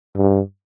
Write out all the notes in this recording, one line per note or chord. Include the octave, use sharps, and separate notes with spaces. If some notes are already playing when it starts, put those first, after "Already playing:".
G2